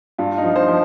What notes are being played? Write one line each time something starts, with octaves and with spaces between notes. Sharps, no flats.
G2 F4
D#4
F3
C5
F3